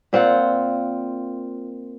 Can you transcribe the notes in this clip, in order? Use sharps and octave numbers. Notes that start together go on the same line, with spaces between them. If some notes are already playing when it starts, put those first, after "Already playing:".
A#2 C4 F4 F#5